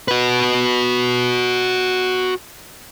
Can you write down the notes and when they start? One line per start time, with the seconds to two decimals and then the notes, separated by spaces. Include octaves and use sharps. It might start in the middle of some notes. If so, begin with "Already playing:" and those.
0.08 F#4 B4